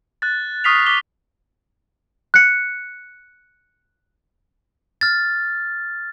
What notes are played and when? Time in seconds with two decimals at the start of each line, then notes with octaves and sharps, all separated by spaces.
0.22 F#6 A6
0.64 C#6 D#6 F6 B6 C7 F7
0.86 D6 B6 G7
2.34 F#6 C#7
5.01 F6 A6